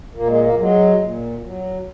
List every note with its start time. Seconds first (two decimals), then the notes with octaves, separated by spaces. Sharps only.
0.14 A#2 A#3
0.27 G#3
0.40 A#3
0.57 F#3 G#3
1.01 A#2
1.43 F#3